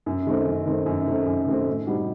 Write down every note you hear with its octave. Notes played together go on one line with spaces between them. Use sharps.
F#2
D#3 A3 C4
F#2
D#3 A3 C4
F#2
D#3 A3 C4
F#2
D#3 A3 C4
A2
G3 C4 D#4 F#4